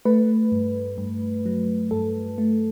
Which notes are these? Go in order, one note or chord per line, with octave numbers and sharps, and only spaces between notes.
A3 B4
G2
G2
F#3
G2 A4
A3